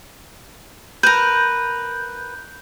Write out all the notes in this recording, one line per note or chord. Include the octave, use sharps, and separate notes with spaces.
A#4 B4 G6